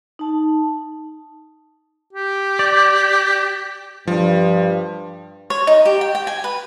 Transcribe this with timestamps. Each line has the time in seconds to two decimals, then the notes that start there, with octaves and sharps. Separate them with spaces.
0.19 D#4 A5
2.13 G4
2.59 D5
4.07 G2 F3
5.50 C#5
5.67 D#4
5.85 G4
6.01 G5
6.15 G5
6.27 G#5
6.44 B4